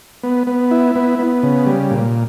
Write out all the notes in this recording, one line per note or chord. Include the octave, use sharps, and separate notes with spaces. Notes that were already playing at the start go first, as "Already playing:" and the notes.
B3
B3
E4
B3
B3
C#3
G3
A#2